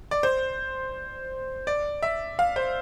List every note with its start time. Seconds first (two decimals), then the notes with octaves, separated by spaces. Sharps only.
0.11 D5
0.23 C5
1.67 D5
2.02 E5
2.39 F5
2.56 C5